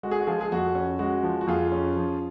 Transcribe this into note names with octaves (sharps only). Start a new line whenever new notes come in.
G#3 F#4
G#4
F#4
F3 F4 G#4
G#4
F2 F#4
C#4
G#3 F#4
F3
F#4
F2 F4 G#4
C#4
F3